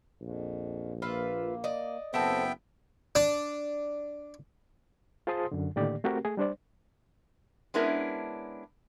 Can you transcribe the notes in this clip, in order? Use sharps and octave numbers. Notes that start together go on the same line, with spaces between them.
A#1 F2
A#3 F4 B4 E5
D5 D#5
F#1 B3 C4 A4 C5 E5 G5 A5
D4
F4 G#4 C5 A5 C6 D#6
F#2 D3
A2 D3 D#3 A#3 G4 D5
A3 C4 F#4 G4 A#4
A3 G#4
G3 D4 C5 D5
G#3 B3 C#4 D4 E4 A#4